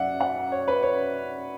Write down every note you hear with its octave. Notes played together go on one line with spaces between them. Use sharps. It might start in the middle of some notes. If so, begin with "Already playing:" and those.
Already playing: F#2 F#3 D5 E5 F#5
F#5
C#5
B4
C#5